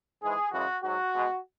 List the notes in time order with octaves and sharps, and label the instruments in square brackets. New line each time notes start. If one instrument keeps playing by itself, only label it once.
[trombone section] G#2 E3 G#3 G#4
F#2 C#3 E3 G#3 F#4
G#2 F#3 F#4
B2 G#3